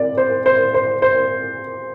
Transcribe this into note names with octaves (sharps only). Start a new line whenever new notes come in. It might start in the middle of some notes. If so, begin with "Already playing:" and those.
Already playing: C4 A#4 D5
C5
C5
C5
C5